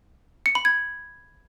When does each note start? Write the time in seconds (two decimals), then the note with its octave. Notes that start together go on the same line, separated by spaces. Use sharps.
0.46 C#7
0.55 B5
0.65 G#6